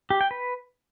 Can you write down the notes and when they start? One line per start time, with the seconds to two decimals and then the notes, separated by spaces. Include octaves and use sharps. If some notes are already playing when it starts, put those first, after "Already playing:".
0.10 G4
0.21 G5
0.31 B4